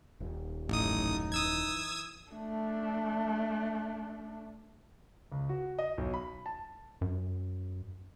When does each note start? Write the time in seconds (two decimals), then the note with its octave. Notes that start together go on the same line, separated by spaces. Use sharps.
0.20 D#1
0.69 A1 F#2 A2 D#4 D#6
1.32 E3 D#6 E6 G#6
2.31 A3 D4
5.32 C#2
5.49 F#4
5.79 D#5
5.98 B1
6.14 B5
6.46 A5
7.01 F#2